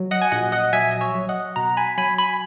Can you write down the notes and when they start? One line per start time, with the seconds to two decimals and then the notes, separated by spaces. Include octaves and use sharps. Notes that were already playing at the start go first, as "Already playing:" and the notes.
Already playing: F#3
0.11 D#5 F#5
0.22 G#5
0.32 A#1 D#5 F#5
0.52 D#5 F#5
0.73 F#3 E5 G#5
0.91 D#5
1.01 C#5 E5
1.15 F#3
1.29 D#5 F#5
1.56 B2 F#5 A#5
1.77 G#5 B5
1.98 F#3 G#5 B5
2.18 G#5 B5